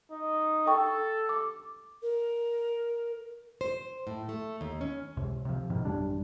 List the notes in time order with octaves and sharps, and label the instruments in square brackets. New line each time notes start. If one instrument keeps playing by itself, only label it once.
[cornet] D#4
[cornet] A4 [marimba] G5 C#6
[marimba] D6
[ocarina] A#4
[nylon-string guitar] C5
A2
A3
D#2
C#4
[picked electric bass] C#2 C3
C3 F3
G1 G#2 B2 D#3
A1 F#2 G3 D4